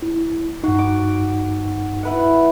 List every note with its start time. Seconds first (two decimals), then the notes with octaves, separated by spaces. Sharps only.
0.02 E4
0.64 G2 D#4 F#4
0.79 D6
2.03 E4 B4 F#5